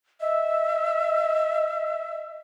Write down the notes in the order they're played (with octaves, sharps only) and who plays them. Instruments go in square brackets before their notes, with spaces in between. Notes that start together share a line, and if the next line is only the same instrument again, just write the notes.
[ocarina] D#5 [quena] E5